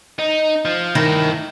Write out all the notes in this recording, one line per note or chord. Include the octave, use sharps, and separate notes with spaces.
D#4
F3
G2 D#3 E4